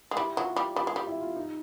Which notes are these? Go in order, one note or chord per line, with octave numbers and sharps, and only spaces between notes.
G#3
G3 E4
F#3 F4
G3
G3 F4
G#3
G3
E4
F4
D#4